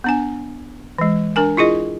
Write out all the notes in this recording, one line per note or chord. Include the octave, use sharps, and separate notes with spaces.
B3 D4 G#5
E3 G#3
D4 A#4 G#5
E4 F4 G#4 D#5